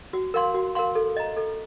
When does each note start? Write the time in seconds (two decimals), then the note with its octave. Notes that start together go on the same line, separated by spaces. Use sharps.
0.13 F#4
0.34 A#4 F5 C6
0.55 F#4
0.75 A#4 F5 C6
0.95 A4
1.17 D#5 A#5
1.37 A4